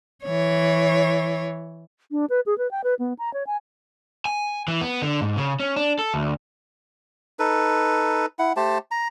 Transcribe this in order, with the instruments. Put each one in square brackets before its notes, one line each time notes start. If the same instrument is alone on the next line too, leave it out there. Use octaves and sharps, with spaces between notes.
[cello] E3 C#5
[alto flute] D4
B4
G#4
B4
G5
B4
B3
A#5
C#5
G#5
[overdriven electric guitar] G#5
E3
B3
D3
G#2
C#3
C#4
D4
A4
D2
[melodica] D#4 A4 B4
E4 F#5
A3 G4 C5 A5
A#5